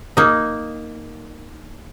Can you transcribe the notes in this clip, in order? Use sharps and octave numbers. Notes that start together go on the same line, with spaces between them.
A#3 D#4